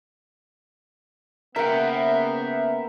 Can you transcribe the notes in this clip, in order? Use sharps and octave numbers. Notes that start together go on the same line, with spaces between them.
C#3 A#3 B3 A#4 E5 F#5 G5